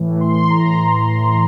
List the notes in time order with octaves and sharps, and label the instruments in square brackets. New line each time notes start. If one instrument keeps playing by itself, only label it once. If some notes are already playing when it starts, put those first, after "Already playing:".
Already playing: [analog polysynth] A2 E3
C6
A#5